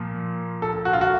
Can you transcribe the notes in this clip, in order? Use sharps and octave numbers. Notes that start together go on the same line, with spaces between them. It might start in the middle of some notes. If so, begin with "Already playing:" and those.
Already playing: A#2 F3
A4
F#4
F4
F#4